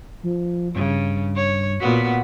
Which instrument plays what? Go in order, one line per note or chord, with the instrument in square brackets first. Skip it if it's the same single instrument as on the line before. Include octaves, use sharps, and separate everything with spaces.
[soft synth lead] F3
[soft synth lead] G2 [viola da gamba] C#3
[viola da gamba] C#5
[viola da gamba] A#2 B3 F#4 [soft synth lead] B6